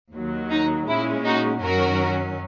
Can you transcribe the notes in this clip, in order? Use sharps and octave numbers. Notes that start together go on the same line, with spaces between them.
D#2 D#3 F#3
D#4
A#2 G#3 C#4 E4
D#4 F#4
F#2 D#3 F#3 C#4 F#4 A#4